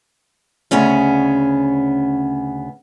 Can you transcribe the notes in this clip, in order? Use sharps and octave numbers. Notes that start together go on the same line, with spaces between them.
D2 C#3 B3 C#4 G#4